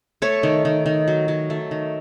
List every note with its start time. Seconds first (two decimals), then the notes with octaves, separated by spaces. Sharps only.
0.22 A3 C#5
0.43 D#3
0.65 D#3
0.86 D#3
1.08 F#3
1.28 F#3
1.50 A3
1.71 D#3